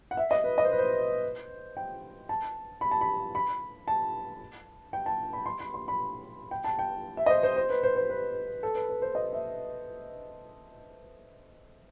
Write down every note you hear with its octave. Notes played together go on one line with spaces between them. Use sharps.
F#5
E5
D#5
B4
D#5
C5
B4
C5
G5
A5
B5
A5
B5
B5
A5
G5
A5
B5
C6
B5
C6
B5
G5
A5
G5
E5
D#5
C5
C5
C5
B4
C5
C5
B4
A4
B4
B4
C5
D#5
E5